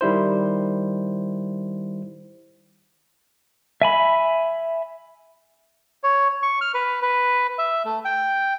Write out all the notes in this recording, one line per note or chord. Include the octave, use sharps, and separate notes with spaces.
D#3 G3 E4 C5
E5 G#5 B5
C#5
C#6
F6
B4
B4
E5
A3
G5